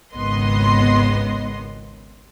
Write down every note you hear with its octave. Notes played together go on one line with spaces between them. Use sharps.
G#1 C#2 B3 D#5 C6